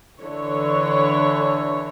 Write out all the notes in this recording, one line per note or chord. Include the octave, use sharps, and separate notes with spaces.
D3 E3 C#5